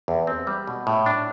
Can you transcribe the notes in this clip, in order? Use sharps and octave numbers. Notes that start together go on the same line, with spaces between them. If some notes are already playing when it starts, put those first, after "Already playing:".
E2
C4
G3
B2
A2
D4